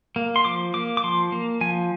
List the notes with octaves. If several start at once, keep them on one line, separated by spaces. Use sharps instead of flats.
A#3
C6
F3 D6
A#3 D6
D6
F3 C6
A#3
F3 G#5